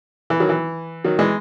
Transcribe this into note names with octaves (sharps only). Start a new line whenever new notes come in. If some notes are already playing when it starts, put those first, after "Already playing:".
E3
D#3 F#3
E3
D#3 F#3
E3 G#3